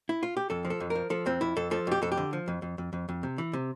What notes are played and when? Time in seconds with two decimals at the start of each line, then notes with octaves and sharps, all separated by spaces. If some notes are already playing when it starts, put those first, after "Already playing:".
0.09 E4
0.23 F4
0.37 G4
0.50 F2 A4
0.65 F3
0.70 A4
0.80 F2
0.90 A#4
0.95 F3
1.10 F3 A4
1.26 F2 C4
1.41 F2 E4
1.56 F2 A4
1.71 F3 A4
1.87 F2 G4
2.02 F2 A4
2.12 G4
2.17 D3
2.33 F3
2.48 F2
2.62 F2
2.78 F2
2.93 F2
3.09 F2
3.23 C3
3.38 E3
3.53 C3